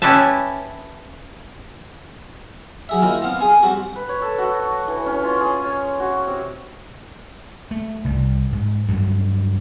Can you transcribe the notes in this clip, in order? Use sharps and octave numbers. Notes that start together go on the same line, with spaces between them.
C#4 E4 G4 B4 E5 A5
F#3 G#4 E5
D#3 A#3 E4 F4
B3 C4 F5
G#4 F5 G#5
G3 C4 F#4
B4
C#5
A4
F#4
C#5
E3
C#4
F4
G#4
C#5
F#4
C3
A3
C2 C3 G3
G#2
D2 G2 F#3